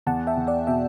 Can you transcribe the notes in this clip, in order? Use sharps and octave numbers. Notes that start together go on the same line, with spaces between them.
E2 F#5 A5
E5 G5
E2
D5 F#5
B2 E5 G5